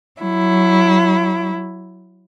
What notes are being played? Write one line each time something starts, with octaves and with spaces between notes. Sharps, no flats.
F#3 E4